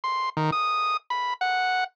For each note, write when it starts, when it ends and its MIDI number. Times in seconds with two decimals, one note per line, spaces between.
0.04 0.30 84
0.37 0.50 51
0.52 0.97 87
1.10 1.34 83
1.41 1.84 78